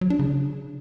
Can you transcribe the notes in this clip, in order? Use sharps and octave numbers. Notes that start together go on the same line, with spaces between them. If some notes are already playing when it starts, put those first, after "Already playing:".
F#3
D4
C#3